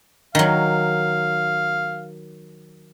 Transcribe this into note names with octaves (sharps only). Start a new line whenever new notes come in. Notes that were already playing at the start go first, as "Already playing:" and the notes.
D#3 F#3 F5